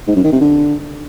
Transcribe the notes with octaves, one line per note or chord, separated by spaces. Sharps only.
G#2
F#2
D#3
C3
D3